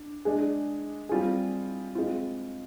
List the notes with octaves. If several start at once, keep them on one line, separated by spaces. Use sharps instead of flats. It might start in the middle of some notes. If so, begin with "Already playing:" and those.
Already playing: D4
G#3 D4 G#4
G3 C4 F4 G#4
G#3 C4 F4